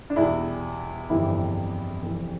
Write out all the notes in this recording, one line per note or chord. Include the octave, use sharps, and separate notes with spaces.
D4
E2 B2 G3 E4
G1 F2 E3 G3 E4
F1 F2 E3 G3